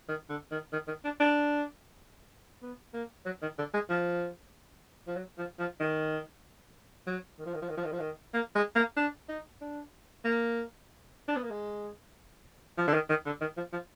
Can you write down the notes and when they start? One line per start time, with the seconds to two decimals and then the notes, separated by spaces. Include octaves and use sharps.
0.08 D#3
0.29 D3
0.51 D#3
0.73 D#3
0.88 D#3
1.04 D4
1.20 D4
2.62 B3
2.94 A#3
3.25 F#3
3.42 D#3
3.58 D3
3.74 G#3
3.89 F3
5.07 F3
5.16 F#3
5.38 F3
5.59 F3
5.80 D#3
7.07 F#3
7.39 D#3
7.46 F3
7.54 D#3
7.62 F3
7.69 D#3
7.77 F3
7.84 D#3
7.92 F3
7.99 D#3
8.34 A#3
8.55 G#3
8.76 A#3
8.97 D4
9.29 D#4
9.61 D4
10.25 A#3
11.28 D4
11.36 B3
11.43 A#3
11.51 G#3
12.78 F3
12.88 D3
12.94 D#3
13.09 D#3
13.26 D3
13.41 D#3
13.57 F3
13.72 F3